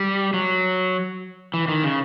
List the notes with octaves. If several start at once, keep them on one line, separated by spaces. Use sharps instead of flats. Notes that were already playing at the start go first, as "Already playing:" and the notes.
Already playing: G3
F#3
E3
D#3
C#3